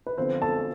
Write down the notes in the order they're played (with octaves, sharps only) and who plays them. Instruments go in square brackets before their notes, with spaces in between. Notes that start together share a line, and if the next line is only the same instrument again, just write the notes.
[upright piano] B4
D3 F3 B3 C4 C5
A4 A5